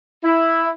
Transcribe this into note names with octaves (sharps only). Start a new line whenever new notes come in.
E4